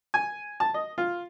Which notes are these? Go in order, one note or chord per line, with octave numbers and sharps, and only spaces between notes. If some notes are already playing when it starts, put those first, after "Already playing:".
G#5
A5
D#5
F4